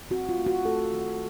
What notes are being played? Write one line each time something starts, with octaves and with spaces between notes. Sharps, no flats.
C4 F#4
F4
A3
F#4
A3 A4
D#3